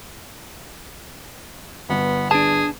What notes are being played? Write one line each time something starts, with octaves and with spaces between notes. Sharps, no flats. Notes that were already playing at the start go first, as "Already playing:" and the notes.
G1 B3
D4 G#4 A5